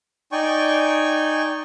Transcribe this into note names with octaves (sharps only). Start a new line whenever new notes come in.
D#4 D5 G5 G#5 C#6